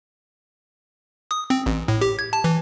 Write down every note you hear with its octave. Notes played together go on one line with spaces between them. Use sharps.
D#6
C4
A1
A2
G4
G#6
A5
E3